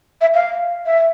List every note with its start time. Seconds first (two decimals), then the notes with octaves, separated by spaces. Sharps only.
0.21 E5
0.34 F5
0.86 E5